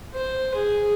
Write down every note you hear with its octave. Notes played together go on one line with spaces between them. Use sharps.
C5
G#4